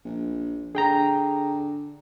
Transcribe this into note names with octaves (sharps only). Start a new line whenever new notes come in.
A#1
D3 G#4 G5 A#5